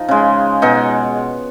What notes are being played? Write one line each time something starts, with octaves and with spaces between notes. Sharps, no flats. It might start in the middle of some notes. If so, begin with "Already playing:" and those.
Already playing: F3 D#4
C#3 G#3
B2 G#3 D#4